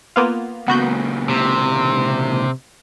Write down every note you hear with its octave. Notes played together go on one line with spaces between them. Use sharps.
A#3 B3 F4
C#2 A#2 B3 F#4 G6
C3